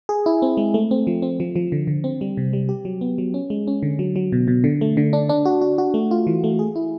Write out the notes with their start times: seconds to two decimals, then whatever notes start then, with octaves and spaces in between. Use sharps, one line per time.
0.09 G#4
0.26 E4
0.42 C4
0.57 G#3
0.74 A3
0.91 C4
1.07 F3
1.22 C4
1.40 F3
1.56 F3
1.72 D3
1.87 D3
2.04 C4
2.21 G3
2.37 C3
2.53 G3
2.69 G4
2.85 F#3
3.01 B3
3.18 F#3
3.34 C#4
3.50 G#3
3.67 C#4
3.83 D3
3.99 F#3
4.16 F#3
4.32 B2
4.48 B2
4.64 D3
4.81 A3
4.97 D3
5.13 D4
5.29 D4
5.45 F#4
5.61 F#4
5.78 F#4
5.94 A3
6.11 F4
6.27 E3
6.44 A3
6.59 G#4
6.75 E4